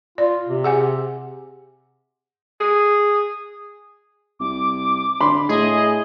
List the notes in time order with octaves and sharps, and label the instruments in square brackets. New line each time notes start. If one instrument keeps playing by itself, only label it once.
[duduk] F4 [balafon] D5
[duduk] C3
[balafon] G#4 F#5 G#5
[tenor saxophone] G#4
[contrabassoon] C2 [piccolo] D6
[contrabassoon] D3 [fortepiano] B5 C6
[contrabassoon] A2 [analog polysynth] G#4 [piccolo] D#5